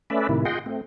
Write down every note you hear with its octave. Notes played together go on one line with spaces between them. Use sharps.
A3 C#4 B4 D5 E5
A2 C3 D#3 E4
F4 G#4 D#5 F#5 G5 C6
A3 C4